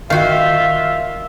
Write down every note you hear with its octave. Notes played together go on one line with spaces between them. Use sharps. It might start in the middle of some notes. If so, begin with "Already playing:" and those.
D#3 F4 F#4 E5 F5